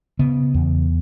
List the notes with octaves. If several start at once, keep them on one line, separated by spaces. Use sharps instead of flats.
C#3 B3
E2